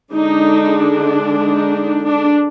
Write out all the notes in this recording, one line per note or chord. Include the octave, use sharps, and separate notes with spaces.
D3 G#3 D4 D#4
D#4
D4